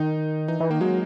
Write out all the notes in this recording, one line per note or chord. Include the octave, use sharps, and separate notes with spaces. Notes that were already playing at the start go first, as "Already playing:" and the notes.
Already playing: D#3 D#4
E3 D#4
E3
D#3 A#3
F#3 G#3